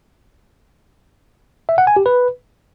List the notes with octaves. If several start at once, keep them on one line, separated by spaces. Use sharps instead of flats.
E5
F#5
G#5
G4
B4